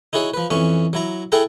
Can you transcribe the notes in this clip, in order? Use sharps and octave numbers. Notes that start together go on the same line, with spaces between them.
D#4 E4 F#4 G#4 C#5
F3 B4
F2 E3 C#4 C#6
F#3 E4 A#5
E4 G#4 A4 F#5 G5 A#5